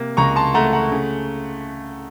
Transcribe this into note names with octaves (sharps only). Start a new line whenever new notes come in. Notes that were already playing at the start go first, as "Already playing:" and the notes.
Already playing: C3 A#3
C#2 A#5 C#6
A5 C6
A3 F#5 A#5
F#5 A#5
C#3